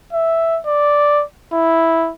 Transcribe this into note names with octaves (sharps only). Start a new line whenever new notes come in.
E5
D5
E4